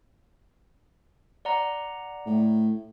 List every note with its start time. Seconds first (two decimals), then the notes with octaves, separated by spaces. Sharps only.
1.45 D5 F#5 A#5
2.26 A2